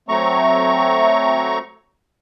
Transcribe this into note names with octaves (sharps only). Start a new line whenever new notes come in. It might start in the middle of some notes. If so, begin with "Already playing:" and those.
F#3 A3 C4 A#5 C#6